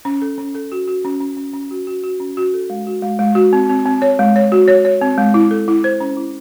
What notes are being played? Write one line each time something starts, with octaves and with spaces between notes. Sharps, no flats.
C#4
A4
C#4
A4
F#4
F#4
C#4
C#4
C#4
C#4
F#4
F#4
F#4
C#4
F#4
A4
G#3
F#4
G#3
G#3
F#4
C4
C4
C4
C#5
G#3
C#5
F#4
C#5
C#5
C4
G#3
E4
A4
E4
C5
C#4
E4